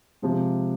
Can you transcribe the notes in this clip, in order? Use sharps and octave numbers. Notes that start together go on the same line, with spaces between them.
C3 F3 G#3